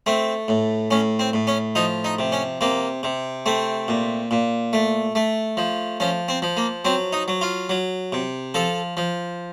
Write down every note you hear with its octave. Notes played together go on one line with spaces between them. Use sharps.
A3 C4
A2
A2 C#4
C4
A2
C#4
F3 D#4
D#4
C3
C#4
C3 A#3
C3
A3 C4
A#2
A#2
A3
A3
F3
F3 C#4
C4
F3
A#3
F#3 C4
D#4
F#3
F4
F#3
C3
F3 A4
F3